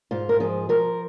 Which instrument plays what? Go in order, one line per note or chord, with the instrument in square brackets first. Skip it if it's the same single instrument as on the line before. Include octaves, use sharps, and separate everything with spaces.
[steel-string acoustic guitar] G#2 F4
A#4
F3 G#4
F3 A#4